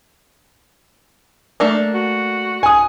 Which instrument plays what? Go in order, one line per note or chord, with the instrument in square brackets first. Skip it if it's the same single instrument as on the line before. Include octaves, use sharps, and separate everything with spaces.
[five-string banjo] A3 A#3 D4
[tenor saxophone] F#4
[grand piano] G#5 D#6